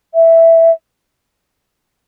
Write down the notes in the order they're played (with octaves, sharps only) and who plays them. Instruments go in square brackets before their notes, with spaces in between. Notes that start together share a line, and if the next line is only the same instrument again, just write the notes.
[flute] E5